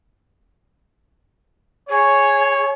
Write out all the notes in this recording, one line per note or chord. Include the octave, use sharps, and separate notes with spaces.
G#4 C#5